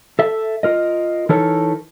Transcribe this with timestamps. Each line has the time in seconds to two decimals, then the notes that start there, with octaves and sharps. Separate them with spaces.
0.19 A4 E5
0.63 F4 A#4 D#5
1.29 E3 D#4 E4 A4 A#4 C#5